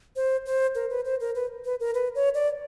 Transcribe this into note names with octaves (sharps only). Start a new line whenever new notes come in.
C5
C5
A#4
B4
C5
A#4
B4
B4
A#4
B4
C#5
D5